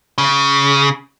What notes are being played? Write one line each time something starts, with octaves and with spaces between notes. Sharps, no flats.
C#3